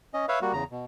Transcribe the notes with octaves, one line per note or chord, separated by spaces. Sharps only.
C#4 D#5
B4 C#5 E5 F5
G3 A#3 F#4
E2 C#3 A#5
B2